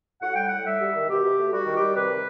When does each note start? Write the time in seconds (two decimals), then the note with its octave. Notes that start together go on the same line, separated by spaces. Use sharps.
0.22 A2 F#5
0.34 G3 G5
0.48 A2 F#5
0.64 G3 E5
0.80 G3
0.94 D#3
1.08 B2 G4
1.23 B2
1.37 A3
1.52 G3 F#4
1.65 D#3
1.73 G4
1.80 G3
1.95 C3 B4
2.09 D#3